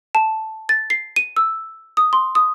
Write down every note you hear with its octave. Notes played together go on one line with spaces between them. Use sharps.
A5
A6
C7
D#7
E6
D#6
C6
D#6